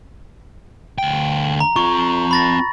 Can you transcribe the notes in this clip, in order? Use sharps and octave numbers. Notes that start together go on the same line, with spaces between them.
D2 G5
A#5
C4 F4 C#6
B5 A6 A#6